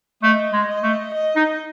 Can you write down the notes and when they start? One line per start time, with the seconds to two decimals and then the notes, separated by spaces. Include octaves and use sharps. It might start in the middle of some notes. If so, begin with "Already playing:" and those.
0.23 A3 D#5
0.53 G#3
0.68 D#5
0.83 A3
1.14 D#5
1.36 D#4